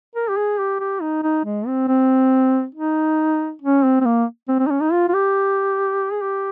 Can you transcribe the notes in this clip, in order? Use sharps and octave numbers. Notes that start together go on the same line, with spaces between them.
A#4
G4
G#4
G4
G4
D#4
D#4
G#3
C4
C4
D#4
C#4
C4
C4
A#3
C4
C4
D#4
C#4
D#4
F4
F4
G4
G#4
G4